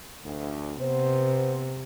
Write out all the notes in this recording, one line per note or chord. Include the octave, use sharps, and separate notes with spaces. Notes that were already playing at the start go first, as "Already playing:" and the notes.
D2
C3 B3 C5